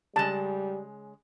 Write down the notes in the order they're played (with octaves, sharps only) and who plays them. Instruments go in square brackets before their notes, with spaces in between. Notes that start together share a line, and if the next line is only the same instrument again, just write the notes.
[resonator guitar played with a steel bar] C#3 G#3 [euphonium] G3 [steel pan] A5